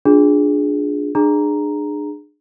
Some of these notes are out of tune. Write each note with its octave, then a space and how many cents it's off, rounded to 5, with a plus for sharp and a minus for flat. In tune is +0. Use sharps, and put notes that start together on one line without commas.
D4 +0 F4 +30 G#4 +0
D4 +30 G#4 +0 A#5 +0